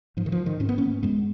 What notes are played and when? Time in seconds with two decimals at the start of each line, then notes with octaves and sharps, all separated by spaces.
0.17 G#2 F3
0.26 D#3
0.32 F3
0.46 D#3
0.60 G#2 C#4
0.69 B3
0.78 A#3 C#4
1.03 F#2 G#3 B3